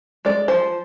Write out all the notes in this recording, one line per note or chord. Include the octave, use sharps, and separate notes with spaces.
G#3 D5
F3 C5